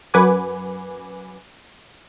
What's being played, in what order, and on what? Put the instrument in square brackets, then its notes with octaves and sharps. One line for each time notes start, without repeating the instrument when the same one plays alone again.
[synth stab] F#2 B4 F#5 G#5 D6